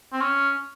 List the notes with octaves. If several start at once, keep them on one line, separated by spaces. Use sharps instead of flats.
C4
C#4